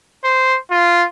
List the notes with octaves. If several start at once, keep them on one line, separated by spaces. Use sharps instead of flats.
C5
F4